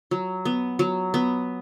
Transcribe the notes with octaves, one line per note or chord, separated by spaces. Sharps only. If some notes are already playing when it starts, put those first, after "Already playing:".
F#3
B3
F#3
B3